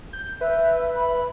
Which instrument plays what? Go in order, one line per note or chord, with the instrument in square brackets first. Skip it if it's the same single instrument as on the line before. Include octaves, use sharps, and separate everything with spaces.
[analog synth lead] G6
[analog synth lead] B4 [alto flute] E5
[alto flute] B5